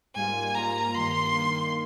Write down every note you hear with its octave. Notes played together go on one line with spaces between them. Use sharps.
G#2 G3 A#3 F4 G#5
G#2 G3 A#3 F4 A#5
G2 D#3 A#3 C6
G2 D#3 A#3